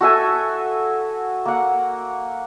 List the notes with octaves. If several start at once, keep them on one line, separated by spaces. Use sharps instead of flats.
F#4 A4 E5 G#5
A#3 F#5